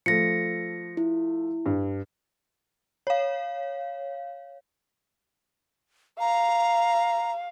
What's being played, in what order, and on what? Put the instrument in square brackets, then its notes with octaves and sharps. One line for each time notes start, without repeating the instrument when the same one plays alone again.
[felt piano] F3 A3 [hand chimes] A#6 C#7
[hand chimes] E4
[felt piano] G2
[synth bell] C#5 F5
[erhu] F5 [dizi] A#5